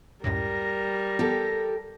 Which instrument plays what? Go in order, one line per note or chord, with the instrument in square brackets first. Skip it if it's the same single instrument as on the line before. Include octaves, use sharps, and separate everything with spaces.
[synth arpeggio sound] C#2 F#2 A2 [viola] G3 A#4 [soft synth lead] A#6
[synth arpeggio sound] B3 [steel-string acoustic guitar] G4 A4